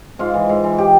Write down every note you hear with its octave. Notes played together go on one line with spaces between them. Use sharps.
G#2 F4
E3
G#2
E3
G4